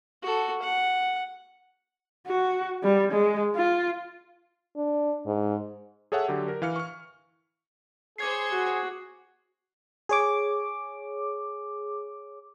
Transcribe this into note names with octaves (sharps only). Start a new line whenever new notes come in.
F#4 A4
F#5
F#4
G3
G#3
F4
D4
G#2
G#4 A4 C#5 E5 F#5
D3 F#3 G4
A#4
E3 F5 F6 C#7
C#6 F6
G#4 C5 C#5 D6 G#6 C7
F#4
G#4 C#5 D6